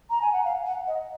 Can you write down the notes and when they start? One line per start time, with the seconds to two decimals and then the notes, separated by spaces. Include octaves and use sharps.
0.10 A#5
0.22 G#5
0.33 F#5
0.45 F5
0.66 F#5
0.87 D#5